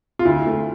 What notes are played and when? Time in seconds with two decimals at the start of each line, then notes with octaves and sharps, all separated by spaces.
0.19 F4
0.25 D2 E4
0.47 A3